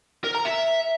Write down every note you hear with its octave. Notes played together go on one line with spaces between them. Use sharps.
A#4
A#5
E5